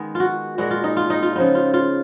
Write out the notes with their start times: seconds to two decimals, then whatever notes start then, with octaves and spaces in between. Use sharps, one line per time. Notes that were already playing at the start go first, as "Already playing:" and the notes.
Already playing: D#3 G#3 B3
0.15 F4
0.20 F#4
0.58 A#2 G#3 B3 F#4
0.71 F4
0.84 D#4
0.97 F4
1.10 D#4
1.22 F4
1.35 C#3 F3 B3 D#4
1.55 F4
1.74 F4